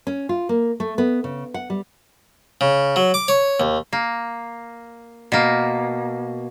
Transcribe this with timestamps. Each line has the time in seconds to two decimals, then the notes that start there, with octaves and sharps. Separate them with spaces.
0.07 C#4
0.29 F4
0.49 A#3
0.80 A3
0.98 B3
1.24 C#3
1.54 F#5
1.70 G3
2.61 C#3
2.96 F#3
3.14 D6
3.28 C#5
3.60 D#2
3.93 A#3
5.32 B2 A#3